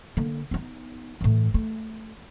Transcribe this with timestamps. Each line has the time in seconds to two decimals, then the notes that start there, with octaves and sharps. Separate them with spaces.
0.17 D3 A#3
0.51 B3 D#4
1.21 A2 E3
1.54 A3